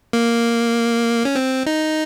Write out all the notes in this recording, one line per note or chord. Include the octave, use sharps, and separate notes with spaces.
A#3
C#4
C4
D#4